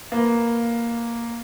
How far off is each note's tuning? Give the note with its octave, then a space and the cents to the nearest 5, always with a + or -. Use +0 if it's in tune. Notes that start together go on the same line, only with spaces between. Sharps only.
A#3 +0 B4 +0